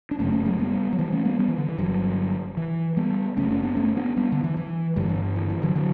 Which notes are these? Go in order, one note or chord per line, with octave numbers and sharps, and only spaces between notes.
D4
F#1 F#2 C#3 A3 C#4
A3 C#4
F#3 A3
G3 B3
F#3
E3 G3
A3 C#4
G3 B3
G3 B3
E3
D3
E3
G1 G2 D3 F#3
E3
G3 B3
F#1 F#2 C#3 A3 C#4
A3 C#4
B3 D4
A3 C#4
B3 D4
G3 B3
D3
E3
E3
G1 G2 D3 E3 G3
D3
E3
E3
D3 F#3
D3 F#3